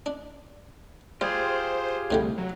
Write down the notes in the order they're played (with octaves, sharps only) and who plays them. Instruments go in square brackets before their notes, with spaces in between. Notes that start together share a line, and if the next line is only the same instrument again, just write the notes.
[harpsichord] D4
[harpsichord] G3 [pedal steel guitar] F4 G4 G#4 [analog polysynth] C5
[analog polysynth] C2 [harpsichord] A2 D3 G3
[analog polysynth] F#3